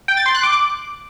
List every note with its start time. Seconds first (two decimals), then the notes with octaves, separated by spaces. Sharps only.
0.08 G5
0.17 A6
0.26 C6
0.35 F#6
0.43 D6